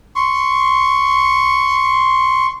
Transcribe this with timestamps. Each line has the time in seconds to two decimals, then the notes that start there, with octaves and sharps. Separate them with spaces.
0.16 C6 C#6